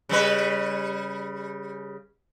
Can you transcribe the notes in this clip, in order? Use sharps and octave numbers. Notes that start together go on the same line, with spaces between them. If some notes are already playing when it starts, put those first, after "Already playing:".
C#3 G3 B4